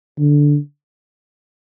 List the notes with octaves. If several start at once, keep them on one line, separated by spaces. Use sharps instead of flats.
D3